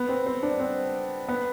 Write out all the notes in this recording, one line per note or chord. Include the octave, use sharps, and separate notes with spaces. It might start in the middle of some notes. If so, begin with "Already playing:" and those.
Already playing: B3
C4
C4
D4
C4
B3